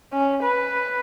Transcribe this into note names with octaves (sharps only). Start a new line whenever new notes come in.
C#4
B4